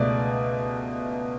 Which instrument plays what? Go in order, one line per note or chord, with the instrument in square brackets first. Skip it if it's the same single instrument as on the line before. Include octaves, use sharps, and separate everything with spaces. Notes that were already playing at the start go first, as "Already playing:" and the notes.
Already playing: [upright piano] C#2 B2 A3 D5